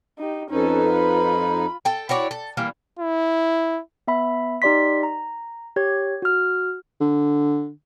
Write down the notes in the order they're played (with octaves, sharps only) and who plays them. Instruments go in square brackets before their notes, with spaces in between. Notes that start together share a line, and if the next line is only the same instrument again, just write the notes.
[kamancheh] D#4 G4
[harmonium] F2 D#4 [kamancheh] C#4 A4 [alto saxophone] B4
[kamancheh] F4 B5
[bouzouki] A4 G5
E4 F#4 C#5 D5
A4
E3 G3 A#3
[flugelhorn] E4
[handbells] B3 E5 B5
D#4 G4 D5 C6 B6
A#5
G4 C#5 G#6
F#4 F6
[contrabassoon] D3